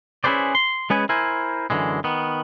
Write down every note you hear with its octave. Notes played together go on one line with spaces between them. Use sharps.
C#4 E4 G#4 B4 C5 D5
C6
G#3 B3 C#4 G#4 B4 G#5
E4 A#4 C5 G#5
F#2 D3 E3 G#3
D#3 B3